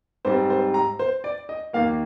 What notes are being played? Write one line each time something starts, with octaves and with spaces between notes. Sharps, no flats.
G#2 G3 C4 C5
C5
A#5
C5
D5
D#5
D#2 D#3 A#3 F5